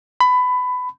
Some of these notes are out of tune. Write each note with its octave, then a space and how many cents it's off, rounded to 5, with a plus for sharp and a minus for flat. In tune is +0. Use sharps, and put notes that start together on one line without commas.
B5 +20